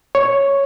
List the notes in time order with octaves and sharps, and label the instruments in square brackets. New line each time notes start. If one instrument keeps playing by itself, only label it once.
[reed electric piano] C#5